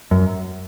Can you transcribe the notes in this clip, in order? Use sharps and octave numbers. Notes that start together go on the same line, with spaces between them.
F#2